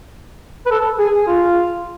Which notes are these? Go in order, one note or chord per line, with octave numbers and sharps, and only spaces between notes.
B4
A4
G#4
G#4
F4